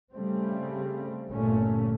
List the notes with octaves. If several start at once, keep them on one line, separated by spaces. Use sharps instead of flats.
C#3 G3 A3 C4
G1 A#2 A3 C#4